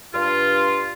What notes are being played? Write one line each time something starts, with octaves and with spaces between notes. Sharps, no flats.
G2 F4